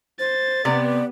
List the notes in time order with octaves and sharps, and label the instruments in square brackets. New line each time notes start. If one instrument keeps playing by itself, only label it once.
[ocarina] C5 [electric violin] A6
[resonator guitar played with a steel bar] C3 [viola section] B3 [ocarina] D5